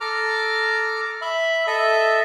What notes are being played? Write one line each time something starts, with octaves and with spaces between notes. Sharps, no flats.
A4 A#5 D6 F6
E5 B5
A4 D#5 E5